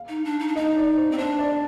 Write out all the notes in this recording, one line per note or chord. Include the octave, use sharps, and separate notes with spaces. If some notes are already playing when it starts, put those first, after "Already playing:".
Already playing: F5
D#4
D4
D#4
D4
D#4 D#5
D5
C5
C4
D4 C5
D5